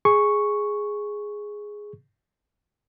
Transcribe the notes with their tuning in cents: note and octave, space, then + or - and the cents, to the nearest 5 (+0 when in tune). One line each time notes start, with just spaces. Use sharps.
G#4 +0 C#6 +0